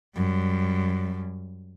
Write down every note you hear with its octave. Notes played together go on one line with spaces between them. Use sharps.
F#2 G3